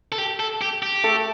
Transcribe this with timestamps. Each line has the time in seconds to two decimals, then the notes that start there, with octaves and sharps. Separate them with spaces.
0.12 A4
0.18 G4
0.40 A4
0.61 G4
0.82 G4
1.04 A3 A4